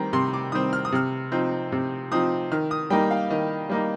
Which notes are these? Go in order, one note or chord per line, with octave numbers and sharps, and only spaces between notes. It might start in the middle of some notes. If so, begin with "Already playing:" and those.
Already playing: D#3 G3 C4 A#5
C3 C6
D6
D#3 G3 C4 D#6
F6
D#6
C3 F6
F3 C4 D#4
C3
F3 C4 D#4 D#6
D#3 F6
D#6
G3 A#3 D#4 G5
F5
D#3 D#5
G3 A#3 D#4